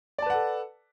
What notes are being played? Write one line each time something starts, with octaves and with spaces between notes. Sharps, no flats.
A4 B4 D5 F#5 A5